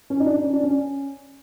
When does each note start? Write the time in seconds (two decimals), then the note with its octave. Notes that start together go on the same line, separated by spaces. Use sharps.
0.10 C#4
0.20 D#4
0.26 D4
0.43 C#4
0.53 D4
0.64 C#4